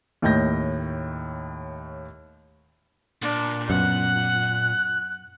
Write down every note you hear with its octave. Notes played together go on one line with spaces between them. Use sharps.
D#2 A2 D#5 G6 A#6
A#2 D4
F#2 B2 F#5 F#6